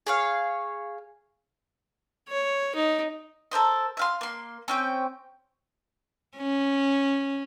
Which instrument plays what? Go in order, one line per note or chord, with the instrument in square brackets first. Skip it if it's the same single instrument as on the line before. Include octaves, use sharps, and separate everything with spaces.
[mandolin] G#4 C#5 F5
[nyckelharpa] C#5
D#4
[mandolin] A4 A#4 C5 D#5
E5 F5 C6
A#3 C6
C4 C#4 G5
[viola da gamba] C#4